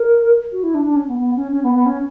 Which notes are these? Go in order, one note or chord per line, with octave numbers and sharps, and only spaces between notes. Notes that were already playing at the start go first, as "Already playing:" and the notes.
Already playing: A#4
F#4
E4
D4
D4
C#4
B3
B3
C#4
C#4
B3
B3
C#4